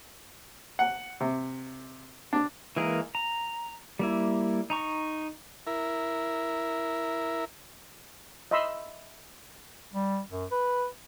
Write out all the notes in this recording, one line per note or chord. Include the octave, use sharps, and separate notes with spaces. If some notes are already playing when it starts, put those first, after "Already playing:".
F#5
C3
D4
E3 G#3 A#3 G#4 A#4
A#5
G3 A#3 E4
D#4 A#5 C#6
E4 A#4
D#5 E5 B5 C6 E6
G3
F#2
B4